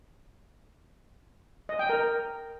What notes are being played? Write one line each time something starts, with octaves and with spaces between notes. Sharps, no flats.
D#5
G5
A#4